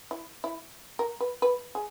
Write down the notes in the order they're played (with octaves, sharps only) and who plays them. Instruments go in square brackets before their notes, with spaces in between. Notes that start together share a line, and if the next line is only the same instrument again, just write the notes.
[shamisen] E4
E4
A#4
B4
B4
G#4